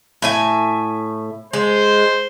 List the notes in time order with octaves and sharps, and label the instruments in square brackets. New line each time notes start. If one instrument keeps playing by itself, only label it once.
[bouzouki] A2 E5 G#5
[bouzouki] G#3 [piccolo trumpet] C5